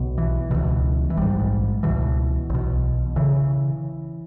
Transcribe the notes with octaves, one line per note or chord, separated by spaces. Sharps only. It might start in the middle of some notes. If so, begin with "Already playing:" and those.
Already playing: B1 B2
E3
C#2 B2 E3
E3
A#1 G#2 G3
C#2 B2 E3
B1 B2
C#3 E3